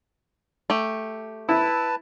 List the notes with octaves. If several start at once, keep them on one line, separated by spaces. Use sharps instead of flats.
A3 G4
E4 B4 A5